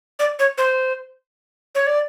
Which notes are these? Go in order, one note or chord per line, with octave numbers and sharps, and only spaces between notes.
D5
C#5
C5
C#5
D5